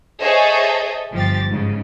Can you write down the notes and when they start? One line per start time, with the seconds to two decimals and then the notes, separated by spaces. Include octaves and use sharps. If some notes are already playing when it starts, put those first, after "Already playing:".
0.21 G#4 A4 C5 C#5 D#5 E5
1.12 G1 F3 G4 A6
1.48 G#2 C#3